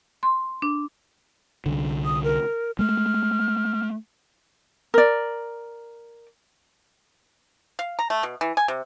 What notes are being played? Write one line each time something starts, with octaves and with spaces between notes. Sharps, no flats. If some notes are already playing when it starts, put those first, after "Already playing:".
C6
D4
C2 D3
D#6
A#4
G#3 A3 F6
A#4 D5
F5
A#5
A3
B2
E3
G#5
C3